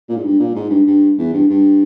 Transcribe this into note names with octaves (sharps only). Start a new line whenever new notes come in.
A#2
G#2
G2
A#2
G#2
G2
G2
E2
G2
G2